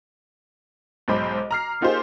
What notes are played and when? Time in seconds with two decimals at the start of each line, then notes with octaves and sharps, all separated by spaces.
1.08 B1 G#2 C5 B5 D6
1.51 A#5 F6 C7
1.81 A#3 D#4 F4 G4 G#4 C5